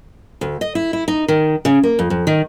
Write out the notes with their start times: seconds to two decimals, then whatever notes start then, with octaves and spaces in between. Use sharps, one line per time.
0.41 D2
0.61 D#5
0.75 E4
0.93 E4
1.08 D#4
1.28 D#3
1.65 C#3
1.83 A#3
1.99 F2
2.10 F2
2.27 D#3